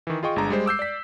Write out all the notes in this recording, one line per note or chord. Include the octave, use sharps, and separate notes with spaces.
D#3 E3
F4 G#4 D#5 G5 C#6
G1 G#3 D4 A#5
G3 G#3 C5
D6 E6 G6 C7
D5 B6